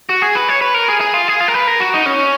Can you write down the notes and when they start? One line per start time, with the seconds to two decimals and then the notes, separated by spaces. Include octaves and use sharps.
0.09 F#4
0.22 G#4
0.35 B4
0.49 C#5
0.62 B4
0.74 A#4
0.89 G#4
1.01 G#4
1.14 F4
1.28 G#4
1.40 F4
1.48 A#4
1.54 B4
1.67 A#4
1.80 F#4
1.94 D#4
2.06 C#4